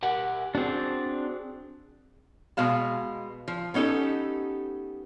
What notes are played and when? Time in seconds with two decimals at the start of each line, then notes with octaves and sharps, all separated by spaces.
0.03 G4 A#4 F#5
0.55 C4 D4 F#4 G#4
2.57 B2 G#3 F5 A5
3.48 F3
3.74 B3 C#4 D#4 G4 A4